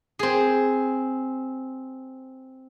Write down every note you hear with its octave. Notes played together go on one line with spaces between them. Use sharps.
C4 G#4